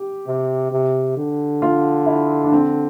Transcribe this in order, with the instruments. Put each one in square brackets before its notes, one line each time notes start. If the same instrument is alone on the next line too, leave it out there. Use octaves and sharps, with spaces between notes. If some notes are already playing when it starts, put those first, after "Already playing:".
Already playing: [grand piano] G4
[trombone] C3
C3
D3
[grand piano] F4
E4
D4
C4